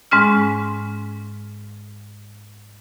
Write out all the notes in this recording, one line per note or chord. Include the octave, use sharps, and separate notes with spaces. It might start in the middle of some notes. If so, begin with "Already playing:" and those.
G#2 G#3 C#4 F6